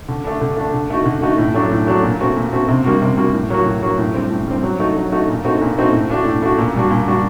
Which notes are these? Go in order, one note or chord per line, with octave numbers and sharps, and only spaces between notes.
D3
A3 D4
D3
A3 D4
D3
A3 D#4 F#4
D3
A3 D#4 F#4
A2
F#3 A3 D4 F#4
A2
F#3 A3 D4 F#4
A#2
A3 C4 F#4
A#2
A3 C4 F#4
C3
G3 A#3 F#4
C3
G3 A#3 F#4
A2
F#3 A#3 F#4
A2
F#3 A#3 F#4
A2
G3 C4
A2
G3 C4
F#3
A3 D#4 F#4
F#3
A3 D#4 F#4
A#2
A3 C4 D#4 F#4
A#2
A3 C4 D#4 F#4
A2
A3 D4 F#4
A2
A3 D4 F#4
A#2
G3 D4 F#4
A#2
G3 D4 F#4